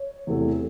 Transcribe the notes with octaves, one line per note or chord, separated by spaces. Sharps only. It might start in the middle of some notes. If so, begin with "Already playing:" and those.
Already playing: C#5
E2 C3 E3 A3